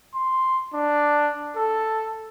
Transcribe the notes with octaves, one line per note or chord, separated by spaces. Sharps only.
C6
D4
A4